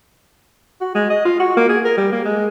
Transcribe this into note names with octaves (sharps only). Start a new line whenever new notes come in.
F#4
G#3
D#5
F4
F#4
A#3
G#4
A#4
G3
A#3
G#3